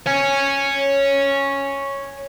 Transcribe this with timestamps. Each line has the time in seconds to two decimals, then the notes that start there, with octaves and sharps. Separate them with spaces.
0.06 C#5 G#5